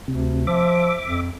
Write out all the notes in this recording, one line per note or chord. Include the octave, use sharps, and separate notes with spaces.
D2 C3
F3 E5 D6
F2